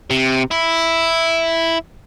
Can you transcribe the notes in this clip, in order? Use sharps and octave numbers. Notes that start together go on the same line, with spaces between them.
C3
E4